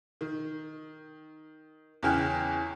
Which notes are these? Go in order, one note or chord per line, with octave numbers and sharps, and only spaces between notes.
D#3
E2 C#3 C#4 G5 F6 F#6